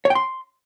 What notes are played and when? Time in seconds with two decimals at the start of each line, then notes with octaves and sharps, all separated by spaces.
0.05 C#5
0.10 G5
0.15 C6